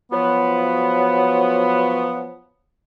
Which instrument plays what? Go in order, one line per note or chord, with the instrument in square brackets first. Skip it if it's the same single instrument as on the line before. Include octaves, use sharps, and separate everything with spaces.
[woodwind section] F3 F#3 B3